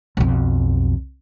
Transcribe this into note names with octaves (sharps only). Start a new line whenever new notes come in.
B1 F2